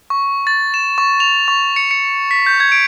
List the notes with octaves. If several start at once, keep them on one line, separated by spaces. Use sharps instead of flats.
C#6
A6
E7
C#6
F7
C#6
C#7
C#7
B6
G6
G#6
D7